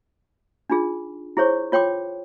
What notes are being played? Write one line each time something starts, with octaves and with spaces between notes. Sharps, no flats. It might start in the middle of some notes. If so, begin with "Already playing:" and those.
D4 D#4 F4 G#4
E4 G#4 C5 C#5 C#6
F4 C#5 G5 C6 D6